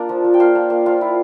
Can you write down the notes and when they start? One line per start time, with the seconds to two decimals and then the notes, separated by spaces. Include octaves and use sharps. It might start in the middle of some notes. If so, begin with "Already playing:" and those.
Already playing: A#3 D4 F4 D5
0.09 F3
0.24 F3
0.34 G5
0.40 A#3 F4 F5
0.55 A#3
0.70 A#3
0.86 F3 F4 F5
1.01 E4